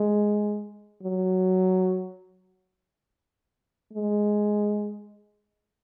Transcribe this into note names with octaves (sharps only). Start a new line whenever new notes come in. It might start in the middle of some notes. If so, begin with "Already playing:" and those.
Already playing: G#3
F#3
G#3